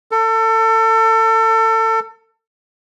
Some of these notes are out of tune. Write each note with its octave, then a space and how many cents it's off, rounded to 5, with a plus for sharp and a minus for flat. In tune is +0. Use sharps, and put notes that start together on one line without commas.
A4 +30